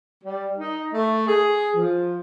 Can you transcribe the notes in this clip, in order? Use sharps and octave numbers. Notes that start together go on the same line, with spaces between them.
G3
D#4
A3
G#4
F3